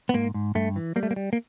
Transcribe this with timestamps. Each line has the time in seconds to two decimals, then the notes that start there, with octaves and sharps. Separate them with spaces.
0.09 B3
0.14 G#2 A#3
0.34 G#2
0.55 G2 A3
0.76 E3
0.96 G3 A#3
1.03 A3
1.11 A#3
1.16 G3
1.33 A#3